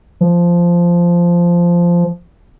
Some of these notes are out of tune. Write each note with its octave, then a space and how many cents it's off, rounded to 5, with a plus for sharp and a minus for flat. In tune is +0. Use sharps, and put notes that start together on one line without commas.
F3 -10